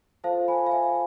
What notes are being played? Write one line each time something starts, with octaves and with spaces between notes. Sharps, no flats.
F4 A4 C5 F5 A5
G#5 B5
F5
E5 G#5